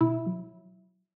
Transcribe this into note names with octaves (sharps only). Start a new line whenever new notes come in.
B2 E4
F#3